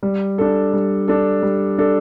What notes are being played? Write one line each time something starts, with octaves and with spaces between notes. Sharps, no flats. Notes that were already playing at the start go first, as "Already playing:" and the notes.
G3
D4 A4
G3
D4 A4
G3
D4 A4